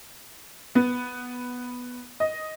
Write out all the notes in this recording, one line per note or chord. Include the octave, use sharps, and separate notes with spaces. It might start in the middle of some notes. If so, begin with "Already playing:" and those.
B3
D#5